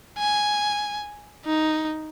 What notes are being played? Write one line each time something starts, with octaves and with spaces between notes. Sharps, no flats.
G#5
D#4